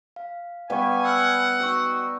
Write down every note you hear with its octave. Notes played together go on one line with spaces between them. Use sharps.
F5
G3 B3 F5 G#5 C#6
F#5 E6 F6
D#4 F#4 G5 C#6 E6